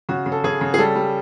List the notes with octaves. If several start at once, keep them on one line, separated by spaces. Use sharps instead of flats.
C#3 F#4
C#3
A4
C#3 G#4
C#3
G#4
G3 A4
G3